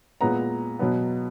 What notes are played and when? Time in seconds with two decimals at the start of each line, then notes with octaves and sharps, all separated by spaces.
0.21 A#2 G#3 B3 A#5
0.79 B2 F#3 B3